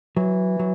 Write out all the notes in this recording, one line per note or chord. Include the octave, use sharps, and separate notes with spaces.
E3 F#3
F#3